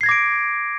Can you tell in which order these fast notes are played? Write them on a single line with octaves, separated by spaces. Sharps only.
C7 G#6 A#6 D6 D7